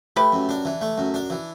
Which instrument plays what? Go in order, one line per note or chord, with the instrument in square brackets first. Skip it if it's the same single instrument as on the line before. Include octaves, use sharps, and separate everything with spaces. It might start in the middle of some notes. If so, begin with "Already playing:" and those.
[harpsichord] A3 [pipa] G4 B4
[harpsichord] F#2
D4
E3
A3
F#2
D4
E3